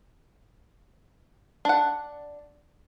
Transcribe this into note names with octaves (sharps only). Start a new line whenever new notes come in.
D4 F#5